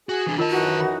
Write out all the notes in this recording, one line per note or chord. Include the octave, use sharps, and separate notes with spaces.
F#4 G#4
E3 D4
D#3 F4 A#4 D#5 A5
F#2 E3 D#4 F#4
B5